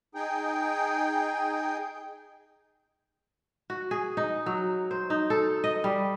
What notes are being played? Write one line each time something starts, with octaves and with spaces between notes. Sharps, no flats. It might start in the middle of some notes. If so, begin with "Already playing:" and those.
D#4 G#4 G5
F#4
G#4
D#4
F#3
C5
D#4
A4
D#5
G3